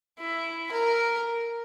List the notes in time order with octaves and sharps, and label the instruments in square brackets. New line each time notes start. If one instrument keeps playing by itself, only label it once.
[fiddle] E4
A#4